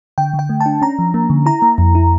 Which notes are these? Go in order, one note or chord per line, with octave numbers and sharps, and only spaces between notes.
D3 G5
D3
G5
A3
A5
D4
C#4 A#5
F3
A#3
D3
E4 A#5
A#3
F2
E4